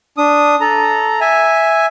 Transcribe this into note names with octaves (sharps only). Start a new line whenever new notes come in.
D4 D#6
A4 A#5
E5 G#5